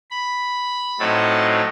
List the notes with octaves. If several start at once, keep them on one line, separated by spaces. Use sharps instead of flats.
B5
A2 F#3 C4 D#4 A5